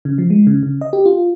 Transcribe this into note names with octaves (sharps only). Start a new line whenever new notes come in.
C#3
F3
G#3
C#3
C#3
D#5
G4
F4